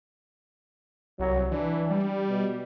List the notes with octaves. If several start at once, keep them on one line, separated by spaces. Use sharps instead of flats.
C2 F#3
E3 D4
G3
B2